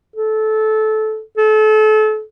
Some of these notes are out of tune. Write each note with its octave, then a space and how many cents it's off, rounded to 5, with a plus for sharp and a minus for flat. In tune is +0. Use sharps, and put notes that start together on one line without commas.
A4 -20
A4 -30